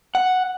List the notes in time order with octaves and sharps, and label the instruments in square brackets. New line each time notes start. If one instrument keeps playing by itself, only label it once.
[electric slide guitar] F#5